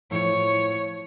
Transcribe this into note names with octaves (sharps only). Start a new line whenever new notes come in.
A2 F3 C#5